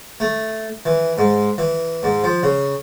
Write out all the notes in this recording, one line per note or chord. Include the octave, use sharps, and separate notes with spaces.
A3
E3
G#2
E3
G#2
F3
C#3